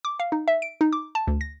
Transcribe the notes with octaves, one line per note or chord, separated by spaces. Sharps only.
D6
F5
D#4
E5
D7
D#4
D6
A5
D2
A#6